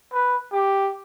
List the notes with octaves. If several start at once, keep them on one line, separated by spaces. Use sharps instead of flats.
B4
G4